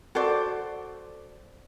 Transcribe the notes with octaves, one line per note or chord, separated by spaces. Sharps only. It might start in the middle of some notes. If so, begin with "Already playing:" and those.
F#4 A4 C5 D5